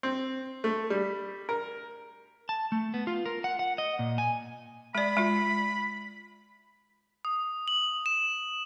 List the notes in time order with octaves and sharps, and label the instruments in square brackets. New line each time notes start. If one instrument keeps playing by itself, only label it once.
[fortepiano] C4
A3
G3
A#4
[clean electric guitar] A5
A3
B3
F4
A#4
F#5
F#5
D#5
A#2
G#5
[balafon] G#3 D5 [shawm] B5
[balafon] G#3 F4
[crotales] D#6
F#7
E7